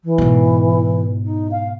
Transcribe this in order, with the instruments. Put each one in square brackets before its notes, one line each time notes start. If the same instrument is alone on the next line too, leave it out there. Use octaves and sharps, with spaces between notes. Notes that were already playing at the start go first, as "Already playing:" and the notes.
[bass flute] E3
[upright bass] G#2 B2
[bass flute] D#4
F5